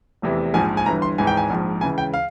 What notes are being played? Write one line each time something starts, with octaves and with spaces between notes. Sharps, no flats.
F1 E2 C3 E3
A#1 G#2 F3 G#5
G#5
G1 G2 E3 A#5
C6
G#1 G#2 E3 G#5
G5
G#5
A#1 G#2 F3
C#2 C#3 E3 G#5
G5
F5